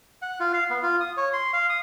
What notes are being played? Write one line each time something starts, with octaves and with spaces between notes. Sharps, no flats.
F#5
F4
F5
B3
F4
D#6
C#5
C6
F5
D#6